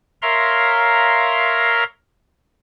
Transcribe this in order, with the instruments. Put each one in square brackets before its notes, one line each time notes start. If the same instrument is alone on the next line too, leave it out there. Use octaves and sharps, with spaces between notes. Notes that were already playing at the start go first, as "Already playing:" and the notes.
[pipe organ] A#4 C#5 E5 F5 A#5 C6